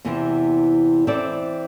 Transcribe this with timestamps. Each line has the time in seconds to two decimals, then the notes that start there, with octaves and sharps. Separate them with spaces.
0.05 E2 C3 E3 C4
1.07 E3 C4 A4 D5